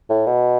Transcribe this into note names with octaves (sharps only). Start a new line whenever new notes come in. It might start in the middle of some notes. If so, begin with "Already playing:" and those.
A2
B2